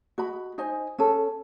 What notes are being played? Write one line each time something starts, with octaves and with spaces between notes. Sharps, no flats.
F#4 D#5 B5
D#4 C5 D#5 G#5
C#4 A4